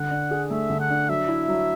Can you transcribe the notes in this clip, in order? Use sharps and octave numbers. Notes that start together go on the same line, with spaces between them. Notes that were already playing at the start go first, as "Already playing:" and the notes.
Already playing: D3 F#5
D4
G#4
A3 E5
D3
F#5
D4
F#3 E5
E4
F#3